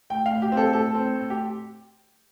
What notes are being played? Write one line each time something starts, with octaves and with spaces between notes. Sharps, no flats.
A2 G5
F5
A2
G4
C4
A4
A2 A4
C4
A2
G4